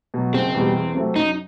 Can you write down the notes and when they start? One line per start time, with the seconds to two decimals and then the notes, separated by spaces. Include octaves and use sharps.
0.14 B2 F#3
0.34 F#1 C4
0.54 E2 B2 G3
0.76 E2
0.95 C3 F#3 A3 C4
1.16 F#2 D#4